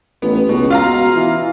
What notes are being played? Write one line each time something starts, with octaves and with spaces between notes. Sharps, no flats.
A1 B3
C#2 B2
F4 F5 A#5
B2
E3